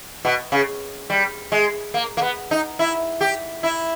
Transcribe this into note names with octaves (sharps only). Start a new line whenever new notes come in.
B2
C#3
G3
G#3
A#3
A#3
B3
D#4
E4
G4
E4